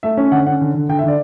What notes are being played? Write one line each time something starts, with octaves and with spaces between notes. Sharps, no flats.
A3 E5
C#4
D3 F#5
C#4 F#5
D3
D3
D3 G5
E5
D3 D5